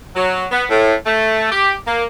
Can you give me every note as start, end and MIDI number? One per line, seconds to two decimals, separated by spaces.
0.16 0.47 54
0.52 0.65 59
0.70 0.95 45
1.06 1.50 57
1.52 1.75 67
1.88 2.05 58